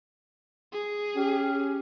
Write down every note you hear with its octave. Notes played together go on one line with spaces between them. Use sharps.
G#4
C#4 G4